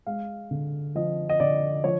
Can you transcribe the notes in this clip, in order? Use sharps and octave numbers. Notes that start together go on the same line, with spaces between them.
G#3 F5
D3
F3 D#5
D#5
D3 D5
F3 C#5